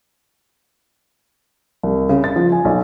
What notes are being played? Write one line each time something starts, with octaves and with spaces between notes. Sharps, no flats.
C2
C#3
A6
F3
G#5
B1